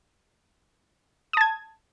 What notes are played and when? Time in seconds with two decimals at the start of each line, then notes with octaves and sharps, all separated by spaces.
1.33 D#6
1.37 A5
1.41 G#6